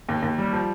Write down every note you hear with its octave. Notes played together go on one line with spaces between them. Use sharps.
D#2
D#2
G3
F3